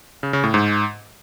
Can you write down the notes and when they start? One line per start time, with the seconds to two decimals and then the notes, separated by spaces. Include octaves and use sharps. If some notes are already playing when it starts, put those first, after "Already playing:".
0.23 C#3
0.33 C#3
0.44 A2
0.54 G#2